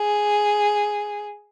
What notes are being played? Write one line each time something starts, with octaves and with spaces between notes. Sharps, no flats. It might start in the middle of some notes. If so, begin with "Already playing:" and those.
Already playing: G#4